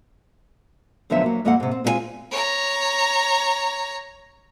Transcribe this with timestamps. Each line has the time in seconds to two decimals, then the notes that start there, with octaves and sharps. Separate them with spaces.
1.10 D2 D3 F3 F#3 B3 E5
1.24 F#3 A#3
1.45 F2 G#3 A#3 A4 D#5 F#5
1.60 G#2 C3
1.71 C4
1.84 G#3 C4 E4 F4 G#5
2.31 C#5 A#5